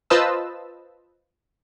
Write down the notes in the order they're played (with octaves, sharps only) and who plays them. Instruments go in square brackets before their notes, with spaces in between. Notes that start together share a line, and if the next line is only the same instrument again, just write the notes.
[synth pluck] F4 B4 C5 D#5 A5 E6